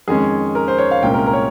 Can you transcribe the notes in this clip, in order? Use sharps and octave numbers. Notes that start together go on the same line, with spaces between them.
F2 D#3 G#3 C#4 G#4
A#4
C5
C#5
F5
C2 A#2 G#3 C#4 G5
A#4
A#4
C#5